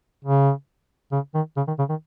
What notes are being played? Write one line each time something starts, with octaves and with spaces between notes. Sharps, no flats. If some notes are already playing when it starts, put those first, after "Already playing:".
C#3
C#3
D#3
C#3
D#3
C#3
D#3